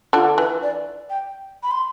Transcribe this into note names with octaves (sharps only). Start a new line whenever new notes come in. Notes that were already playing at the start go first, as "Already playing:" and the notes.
D3 D4 F4
E3 B4
D5
G5
B5
C6